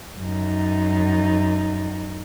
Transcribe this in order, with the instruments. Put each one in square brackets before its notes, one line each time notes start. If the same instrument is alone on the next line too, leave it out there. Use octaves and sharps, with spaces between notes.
[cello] F#2 D#4